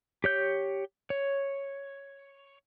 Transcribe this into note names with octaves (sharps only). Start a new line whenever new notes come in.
G4 C#5 G6
C#5